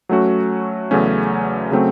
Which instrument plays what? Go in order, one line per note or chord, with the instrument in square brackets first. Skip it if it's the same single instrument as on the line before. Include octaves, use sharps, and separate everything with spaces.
[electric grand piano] F#3 A3 C#4 F#4
E2 C#3 F#3 A3 C#4
C#3 F#3 A3 C4